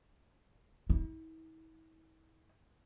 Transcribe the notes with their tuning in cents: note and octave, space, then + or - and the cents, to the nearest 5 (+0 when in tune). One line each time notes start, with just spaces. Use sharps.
E4 -45